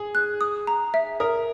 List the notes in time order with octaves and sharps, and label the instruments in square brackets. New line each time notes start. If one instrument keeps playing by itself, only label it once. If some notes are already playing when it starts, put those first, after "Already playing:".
Already playing: [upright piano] G#4
[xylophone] F#6
D#6
A#5
E5
[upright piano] A#4 [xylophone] D#6